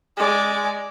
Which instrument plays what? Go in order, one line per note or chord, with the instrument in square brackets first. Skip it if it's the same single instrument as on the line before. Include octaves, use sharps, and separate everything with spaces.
[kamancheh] G#3 D5